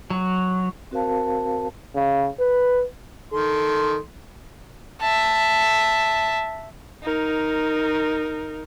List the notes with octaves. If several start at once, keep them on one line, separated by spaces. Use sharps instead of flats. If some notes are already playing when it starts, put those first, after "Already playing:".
F#3
C4 F#4 A#4 C5 F5 A5
C#3
B4
D#3 A4 C6
E5 A5
D#4 A#4